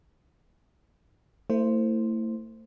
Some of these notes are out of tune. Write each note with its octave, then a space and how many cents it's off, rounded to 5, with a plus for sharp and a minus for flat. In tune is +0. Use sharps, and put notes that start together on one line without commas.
A3 +40 E4 +0 C5 +0